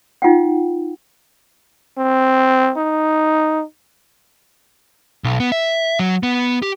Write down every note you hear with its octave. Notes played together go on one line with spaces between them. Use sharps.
D#4 F4 F#5 G5
C4
D#4
B1
B3
E5
F#3
B3
G4